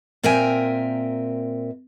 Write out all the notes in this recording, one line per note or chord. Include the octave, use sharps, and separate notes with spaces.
A#2 C4 A#4 E5 G5 G#5